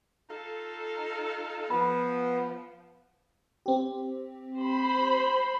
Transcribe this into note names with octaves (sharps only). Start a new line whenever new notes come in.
D#4 F4 A4
F3 B3 B5
C4 G4
C5 B5 C6